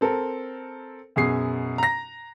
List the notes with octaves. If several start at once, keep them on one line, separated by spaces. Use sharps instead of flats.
C4 A4 A#4
F#2 B2 G#4 C7
A#5 A#6